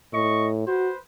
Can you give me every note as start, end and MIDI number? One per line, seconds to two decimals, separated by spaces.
0.13 0.66 45
0.13 0.48 75
0.13 0.48 85
0.67 0.91 66
0.67 0.97 71
0.67 0.97 72